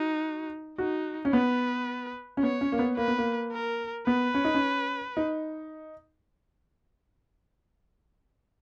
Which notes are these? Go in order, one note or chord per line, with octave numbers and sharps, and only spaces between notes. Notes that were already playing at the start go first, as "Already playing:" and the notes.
Already playing: D#4 F#4
D#4 F#4
C#4
B3 B4
C#4
B3 C#5
C#4
A#3
B3
A#3 B4
B3
A#3
A#4
B3 B4
C#4
D#4
C#4
D#4